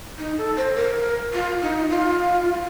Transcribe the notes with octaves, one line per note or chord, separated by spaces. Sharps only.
D#4
A4
C5
A#4
F4
D#4
F4